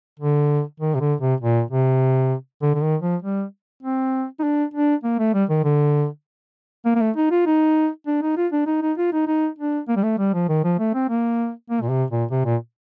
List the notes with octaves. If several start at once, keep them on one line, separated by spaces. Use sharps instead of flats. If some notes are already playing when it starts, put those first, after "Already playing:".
D3
D#3
C3
D3
C3
A#2
C3
D3
D3
D#3
F3
G3
C4
D#4
D4
D4
A#3
A3
G3
D#3
D3
A#3
A#3
A3
D#4
F4
D#4
D4
D#4
F4
D4
D#4
D#4
F4
D#4
D#4
D4
A#3
G3
A3
G3
F3
D#3
F3
A3
C4
A#3
A#3
A#2
C3
A#2
C3
A#2